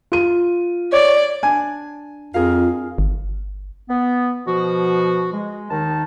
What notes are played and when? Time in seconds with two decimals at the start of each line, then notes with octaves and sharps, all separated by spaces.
0.12 F4 D#7
0.93 C#5 D5
1.43 D4 G#5
2.34 F2 F4 G#4 A#4 F5
2.98 G1
3.89 B3
4.46 B2 F3 F#4
5.33 G#3
5.71 D#2 D#3 D#4 A5